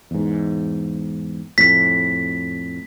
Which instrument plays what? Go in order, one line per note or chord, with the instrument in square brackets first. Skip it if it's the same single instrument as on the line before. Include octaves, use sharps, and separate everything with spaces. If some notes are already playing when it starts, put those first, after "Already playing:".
[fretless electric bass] E2 G#2
[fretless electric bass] F2 A2 [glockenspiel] B6